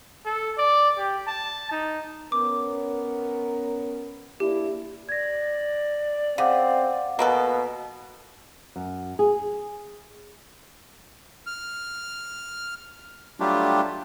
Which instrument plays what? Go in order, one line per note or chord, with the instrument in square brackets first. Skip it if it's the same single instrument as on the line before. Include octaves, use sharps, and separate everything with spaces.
[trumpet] A4
D5
G4
A5
D#4
[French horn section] B3 C#4 A#4 [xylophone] D6
[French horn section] A#3 D4 E4 [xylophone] G4
[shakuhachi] D5 [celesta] G#6 A#6
[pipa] C#3 [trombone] C4 [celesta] F5 F#5 D6
[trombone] B2 [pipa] A#3 B3 A4
[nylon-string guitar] F#2
G#4
[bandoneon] F6
F#3 G3 A3 D4 F4 G4